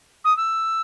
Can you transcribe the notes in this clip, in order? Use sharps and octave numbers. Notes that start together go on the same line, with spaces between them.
D#6
E6